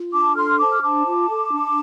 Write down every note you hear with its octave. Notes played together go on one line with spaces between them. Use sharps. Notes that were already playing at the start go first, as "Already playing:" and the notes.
Already playing: F4
D4 A5 D6
A4 C6 F6
C5 A5 D6
F6
D4 A5 D6
F4
A4
D4